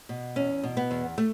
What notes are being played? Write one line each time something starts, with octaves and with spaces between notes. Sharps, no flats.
B2
E2 C#4
B2
B3
E2
A3